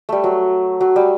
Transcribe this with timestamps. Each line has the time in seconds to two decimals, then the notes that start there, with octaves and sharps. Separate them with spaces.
0.09 G3 A3
0.24 F#3
0.81 F#3
0.96 G3